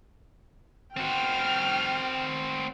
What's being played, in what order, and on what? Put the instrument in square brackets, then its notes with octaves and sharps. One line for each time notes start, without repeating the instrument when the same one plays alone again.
[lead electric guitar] C4 F#4 [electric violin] G5 F6